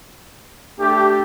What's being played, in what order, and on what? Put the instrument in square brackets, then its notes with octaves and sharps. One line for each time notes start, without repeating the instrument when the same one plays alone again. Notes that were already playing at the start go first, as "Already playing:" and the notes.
[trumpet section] A3 D4 G4